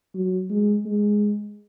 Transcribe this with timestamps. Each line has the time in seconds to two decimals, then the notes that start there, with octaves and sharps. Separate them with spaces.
0.15 F#3
0.50 G#3
0.85 G#3